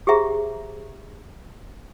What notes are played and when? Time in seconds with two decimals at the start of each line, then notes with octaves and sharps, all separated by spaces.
0.07 G4 G#4 C5 E5 A#5